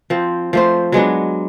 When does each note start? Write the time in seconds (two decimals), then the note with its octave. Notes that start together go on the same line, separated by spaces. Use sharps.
0.10 F3 C4
0.53 F3 A3 C5
0.92 F#3 G#3 B3 D4